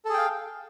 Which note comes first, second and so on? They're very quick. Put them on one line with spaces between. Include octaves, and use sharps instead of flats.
A4 G#4 G5 F5